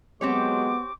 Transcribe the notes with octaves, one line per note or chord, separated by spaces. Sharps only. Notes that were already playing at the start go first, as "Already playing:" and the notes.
F#3 G#3 B3 C4 G4 C#5 D6